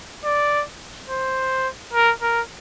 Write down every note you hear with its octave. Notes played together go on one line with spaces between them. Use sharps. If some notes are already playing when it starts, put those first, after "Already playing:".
D5
C5
A#4
A#4